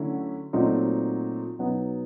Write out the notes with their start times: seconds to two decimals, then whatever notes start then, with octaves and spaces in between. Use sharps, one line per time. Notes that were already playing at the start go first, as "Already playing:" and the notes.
Already playing: D3 F#3 A3 C#4 E4
0.53 A#2 F#3 A3 C4 D#4
1.59 B2 F#3 B3 D#4